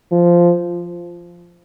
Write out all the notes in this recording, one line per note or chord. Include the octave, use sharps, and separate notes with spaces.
F3